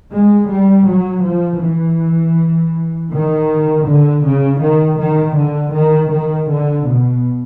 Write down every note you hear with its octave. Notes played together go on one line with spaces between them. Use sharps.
G#3
G3
F#3
F3
E3
D#3
D3
C#3
D#3
D#3
D3
D#3
D#3
D3
B2